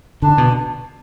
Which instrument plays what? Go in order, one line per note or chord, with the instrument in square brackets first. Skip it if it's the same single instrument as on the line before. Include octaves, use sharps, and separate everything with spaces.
[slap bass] D3 [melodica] D4
[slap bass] B2